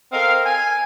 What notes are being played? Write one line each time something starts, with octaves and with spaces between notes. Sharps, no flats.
C4 A4 A#4 D#5 F5
G#5